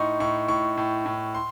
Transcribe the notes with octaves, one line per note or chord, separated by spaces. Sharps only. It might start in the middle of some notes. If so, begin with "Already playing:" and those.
Already playing: A2 D#4 C6 C#6
A2 C#6
A2 C#6
A2
A2
C6